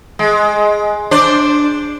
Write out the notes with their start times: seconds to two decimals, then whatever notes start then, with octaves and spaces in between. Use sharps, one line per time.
0.19 G#3
1.11 D4 C5 D5